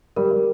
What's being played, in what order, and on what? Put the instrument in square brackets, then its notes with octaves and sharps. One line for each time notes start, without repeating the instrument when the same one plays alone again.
[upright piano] G3 [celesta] A#4
[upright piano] G3